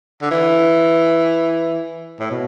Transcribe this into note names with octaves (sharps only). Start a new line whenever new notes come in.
D3
E3
A2
B2